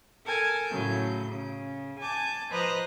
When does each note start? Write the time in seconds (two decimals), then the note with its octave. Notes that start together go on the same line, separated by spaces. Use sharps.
0.25 A4 A#4 G#5 A5 G#6
0.68 A2 C#3 F#3 G6
1.31 C#3
1.99 G#5 A5 D6 G6
2.50 F3 B4 C5 D#5 A#5 F#6